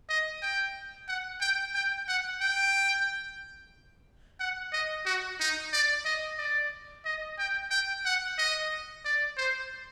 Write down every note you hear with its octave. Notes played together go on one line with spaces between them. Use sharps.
D#5
G5
F#5
G5
G5
F#5
G5
F#5
D#5
F#4
D#4
D5
D#5
D5
D#5
G5
G5
F#5
D#5
D5
C5